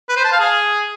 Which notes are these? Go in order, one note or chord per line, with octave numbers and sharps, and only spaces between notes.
B4
C5
A5
F5
G#4